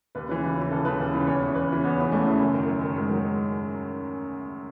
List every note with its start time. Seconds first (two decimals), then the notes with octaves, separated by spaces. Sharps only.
0.15 D#2 B4
0.29 C#3 E3 B4
0.43 D#2
0.57 C#3
0.62 E3
0.71 D#2 A4
0.85 C#3 E3 B4
1.00 D#2
1.14 C#3 E3
1.27 E2 C#5
1.42 C#3 E3
1.55 E2 B4
1.69 C#3 E3 C#4
1.83 E2 B3
1.98 C#3 E3
2.12 E2 A3
2.26 C#3 E3
2.39 F#2
2.54 D#3
2.68 F#2
2.81 D#3
2.96 F#2 G#3
3.10 D#3 F#3
3.24 G#3